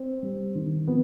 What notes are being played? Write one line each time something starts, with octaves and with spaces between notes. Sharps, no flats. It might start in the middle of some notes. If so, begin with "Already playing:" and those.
Already playing: C4
G3
D#3
F3 B3